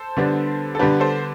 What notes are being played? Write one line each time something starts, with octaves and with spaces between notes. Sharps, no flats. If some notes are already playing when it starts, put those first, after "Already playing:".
Already playing: A4 C5
D3 G3 B3 D4
A4
D3 G3 B3 D4 G4 B4
A4 C5